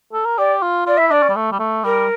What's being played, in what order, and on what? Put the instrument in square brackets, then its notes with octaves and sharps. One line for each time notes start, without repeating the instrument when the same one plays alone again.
[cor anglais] A4
A#4
[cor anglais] G4 [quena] D5
[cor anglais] F4
[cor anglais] F4 [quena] D5
[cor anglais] E4 [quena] E5
[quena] E5
[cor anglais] D4 [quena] D5
[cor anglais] C#4
G3
A3
G3
A3
[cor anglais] G3 [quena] A#4